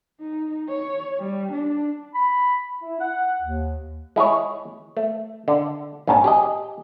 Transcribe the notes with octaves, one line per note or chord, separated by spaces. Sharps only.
D#4
C#5
G3
D4
B5
E4
F#5
D#2
G#3 E4 G#4 C#5
A3
D3
A#1 G#2 C4 C#4 A5
G4 G#4 D#5